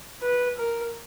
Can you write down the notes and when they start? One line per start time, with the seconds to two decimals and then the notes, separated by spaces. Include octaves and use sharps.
0.22 B4
0.57 A#4